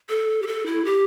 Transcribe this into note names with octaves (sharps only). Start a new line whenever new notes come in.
A4
G4
A4
E4
G4